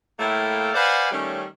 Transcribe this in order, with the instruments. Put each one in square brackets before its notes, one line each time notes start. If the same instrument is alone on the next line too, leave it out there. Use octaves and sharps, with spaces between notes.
[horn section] A2 A3 A#3 E4 F5 G5
B4 C5 D5 F5 F#5 G#5
D#3 G3 A3 C#4